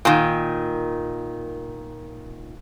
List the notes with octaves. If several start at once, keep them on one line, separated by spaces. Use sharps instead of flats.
A#2 D#3